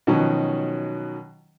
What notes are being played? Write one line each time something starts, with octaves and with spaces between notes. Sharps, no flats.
B2 D#3 F3 F#3 C#4